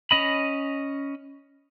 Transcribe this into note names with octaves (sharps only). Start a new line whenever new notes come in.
C#4 D#5 B5